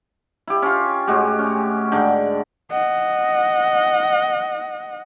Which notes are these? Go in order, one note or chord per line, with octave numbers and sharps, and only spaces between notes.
E4 G4
C#4 F4
A2 G#3 F#4 G4
C#4
G#2 D3 G5
D#5 F#5